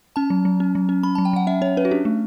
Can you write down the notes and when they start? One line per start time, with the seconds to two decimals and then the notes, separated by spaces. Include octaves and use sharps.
0.16 C#4 A5
0.30 F#3
0.45 F#3
0.60 C#4
0.75 F#3
0.89 C#4
1.03 C#4 B5
1.15 A5
1.18 F#3
1.25 G5
1.33 F#3 F#5
1.47 C#4 E5
1.61 C#4 C#5
1.77 C#4 B4
1.85 F#4
1.91 D4 G4
2.05 A3